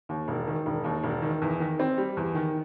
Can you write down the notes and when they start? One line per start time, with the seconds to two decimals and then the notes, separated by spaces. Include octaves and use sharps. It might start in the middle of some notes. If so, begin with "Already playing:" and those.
0.09 D#2
0.28 E1
0.47 D#3
0.66 E1
0.84 D#2
1.03 E1
1.22 D#3
1.42 E2
1.60 D#3
1.79 C4
1.97 G3
2.17 E2
2.35 D#3